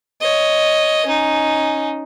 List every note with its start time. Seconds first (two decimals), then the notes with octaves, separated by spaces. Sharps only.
0.21 C#5 D#5
1.06 C#4 D#4